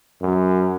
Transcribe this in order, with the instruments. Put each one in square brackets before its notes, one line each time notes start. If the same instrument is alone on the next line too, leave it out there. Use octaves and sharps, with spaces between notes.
[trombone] F#2